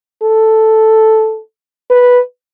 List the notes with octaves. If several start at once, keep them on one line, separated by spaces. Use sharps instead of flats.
A4
B4